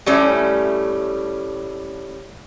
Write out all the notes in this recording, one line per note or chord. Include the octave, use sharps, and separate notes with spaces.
A2 G3 A3 C#4